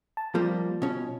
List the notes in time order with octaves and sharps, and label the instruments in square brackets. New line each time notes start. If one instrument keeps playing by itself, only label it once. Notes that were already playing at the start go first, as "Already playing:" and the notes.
[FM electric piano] A5
[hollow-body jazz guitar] F3 G3 A#3 [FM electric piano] F4
[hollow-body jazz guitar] B2 C#4